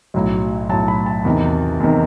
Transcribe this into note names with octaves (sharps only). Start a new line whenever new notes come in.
B1 A2 F#3
B1 A2 F#3 A5
B5
A5
E2 C3 D#3
E2 C3 D#3